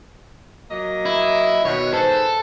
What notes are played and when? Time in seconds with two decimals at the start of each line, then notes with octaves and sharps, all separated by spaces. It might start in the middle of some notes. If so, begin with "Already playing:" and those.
0.70 F#3 A#3 D#5
1.06 E4
1.65 B2 D#3 C#5
1.94 G#2 A4 B4 C5